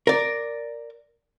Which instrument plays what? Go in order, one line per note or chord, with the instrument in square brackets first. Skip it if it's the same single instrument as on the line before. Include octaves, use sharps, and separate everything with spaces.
[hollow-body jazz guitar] A#4 D5